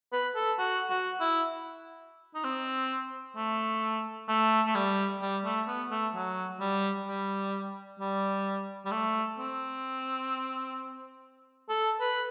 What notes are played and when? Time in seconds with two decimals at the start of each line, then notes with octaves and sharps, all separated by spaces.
0.12 B4
0.35 A4
0.58 F#4
0.90 F#4
1.20 E4
2.35 D#4
2.44 C4
3.36 A3
4.29 A3
4.66 A3
4.75 G3
5.21 G3
5.45 A3
5.67 B3
5.91 A3
6.14 F#3
6.60 G3
7.06 G3
7.99 G3
8.85 G3
8.91 A3
9.38 C4
11.69 A4
12.00 B4